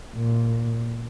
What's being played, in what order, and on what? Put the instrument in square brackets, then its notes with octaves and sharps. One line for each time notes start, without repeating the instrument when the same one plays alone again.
[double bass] A#2